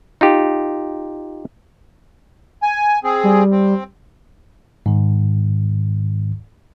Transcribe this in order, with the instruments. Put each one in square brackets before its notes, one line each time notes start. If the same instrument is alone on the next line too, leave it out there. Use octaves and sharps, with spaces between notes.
[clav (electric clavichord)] D#4 F4 G4
[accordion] G#5
C4 G#4
[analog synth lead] G3
[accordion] C4
[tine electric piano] G#2 D#3